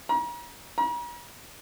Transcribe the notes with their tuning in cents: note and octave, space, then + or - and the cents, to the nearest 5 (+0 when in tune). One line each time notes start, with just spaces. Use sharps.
A#5 +40
A#5 +45